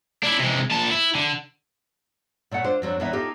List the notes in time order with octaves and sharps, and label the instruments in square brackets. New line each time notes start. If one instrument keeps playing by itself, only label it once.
[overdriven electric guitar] D4 E4
C3 G#3
A#2 A5
E4
D3
[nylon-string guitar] A#2 A3 C#5 F#5
D4 F4 C5
F2 F#3 C4 D4
E2 A2 B3 D#4 E5
D#4 F4 G4 A4